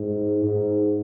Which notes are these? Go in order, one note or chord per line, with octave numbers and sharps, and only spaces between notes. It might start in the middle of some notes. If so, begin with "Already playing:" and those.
Already playing: G#2
G#2